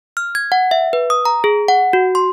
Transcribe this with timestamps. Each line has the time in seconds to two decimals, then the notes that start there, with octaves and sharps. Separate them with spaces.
0.17 F6
0.35 G#6
0.52 F#5
0.71 E5
0.93 B4
1.10 D#6
1.25 A#5
1.44 G#4
1.68 F#5
1.93 F#4
2.15 C6